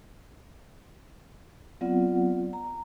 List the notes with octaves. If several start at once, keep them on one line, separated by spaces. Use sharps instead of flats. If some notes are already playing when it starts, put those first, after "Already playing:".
F#3 B3 C4 F4 D5 F#5
A#5